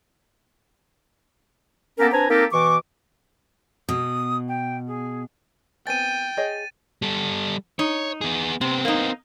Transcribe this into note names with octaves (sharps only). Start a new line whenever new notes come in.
A#3 B3 C#4 G4 A4 A#4
C4 D4 B4 G#5 A#5
A#3 C4 D#4 G4 A4 A#4
B2 E3 C#6 D6
B2 D#6
G5
G#4
B3 C4 G5 G#5 A6 D#7
G#4 C#5 D#5
G3 A4
D#4 C#5
B3 G#4
C3 B3 C4
A#3 D#4